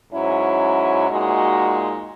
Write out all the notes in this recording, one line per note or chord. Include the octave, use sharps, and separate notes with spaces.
G#2 F#3 C#4 E4
A#2 G#3 D#4 F#4